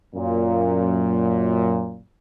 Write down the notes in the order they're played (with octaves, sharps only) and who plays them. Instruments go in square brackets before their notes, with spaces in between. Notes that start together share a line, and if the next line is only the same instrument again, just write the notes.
[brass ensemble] F#2 A#2